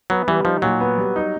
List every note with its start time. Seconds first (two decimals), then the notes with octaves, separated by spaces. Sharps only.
0.10 F#3 B3
0.28 E3 G3
0.45 F3 D#4
0.62 A#2 F#3
0.80 B3
0.98 G3
1.16 D#4